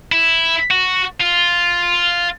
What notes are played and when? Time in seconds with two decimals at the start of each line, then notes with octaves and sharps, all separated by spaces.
0.12 E4
0.70 F#4
1.20 F4